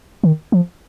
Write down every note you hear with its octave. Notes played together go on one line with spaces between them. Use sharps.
D#3
F3